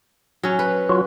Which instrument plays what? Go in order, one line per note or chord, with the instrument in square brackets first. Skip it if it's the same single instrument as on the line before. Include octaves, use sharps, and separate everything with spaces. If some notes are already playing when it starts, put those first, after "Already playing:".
[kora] F#3 C#4
B4
[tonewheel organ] F#3 F4 F#4